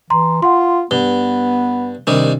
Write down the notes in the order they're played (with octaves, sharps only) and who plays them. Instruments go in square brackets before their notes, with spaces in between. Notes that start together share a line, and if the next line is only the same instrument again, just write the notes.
[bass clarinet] E3 [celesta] A#5 C6
[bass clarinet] F4 [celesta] F#5 C6
[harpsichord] G2 [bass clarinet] B3 [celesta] G7
[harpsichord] C2 D#3 G3 [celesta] D4